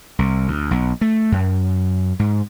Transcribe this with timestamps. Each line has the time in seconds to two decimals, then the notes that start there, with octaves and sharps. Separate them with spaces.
0.19 C2
0.48 D2
0.71 B1
1.01 A3
1.32 F#2
2.19 G#2